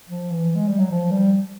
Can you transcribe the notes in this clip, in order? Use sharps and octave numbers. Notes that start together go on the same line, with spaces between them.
F3
E3
G#3
G3
F#3
F3
G3